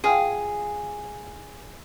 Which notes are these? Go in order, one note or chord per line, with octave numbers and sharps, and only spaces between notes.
F4 G#4 F5 G5